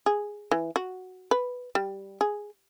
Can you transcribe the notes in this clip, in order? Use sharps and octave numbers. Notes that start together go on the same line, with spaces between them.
G#4
E3
F#4
B4
G3
G#4